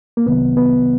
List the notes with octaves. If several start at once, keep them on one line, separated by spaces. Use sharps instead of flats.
A#3
C2 C3 D#3 F#3 B3
B3